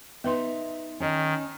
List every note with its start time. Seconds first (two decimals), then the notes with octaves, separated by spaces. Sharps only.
0.24 B3 D#4 B4 E5 C6
1.00 D#3 C#4 C#5 D#5